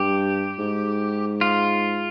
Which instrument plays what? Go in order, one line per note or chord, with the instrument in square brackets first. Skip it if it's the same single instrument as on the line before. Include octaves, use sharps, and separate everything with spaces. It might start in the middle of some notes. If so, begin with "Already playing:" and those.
Already playing: [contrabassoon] G2 [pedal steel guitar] G4
[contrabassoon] G#2
[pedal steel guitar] F4